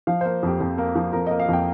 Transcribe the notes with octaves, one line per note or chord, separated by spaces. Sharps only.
F3 F5
A#3 C5
F2 G4
F2
A#3
F3
F2 A#4
A#3 D#5
F5
F2 G5